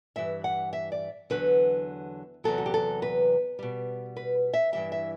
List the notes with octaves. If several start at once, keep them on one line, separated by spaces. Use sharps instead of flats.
G2 E3 G3 E5
F#5
E5
D5
E2 D3 F#3 B4
E2 C3 F#3 A4
F#4
G4
A4
B4
B2 G3
B4
E5
G2 E3 G3 E5
E5